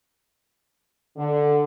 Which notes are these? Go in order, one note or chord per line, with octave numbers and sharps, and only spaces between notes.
D3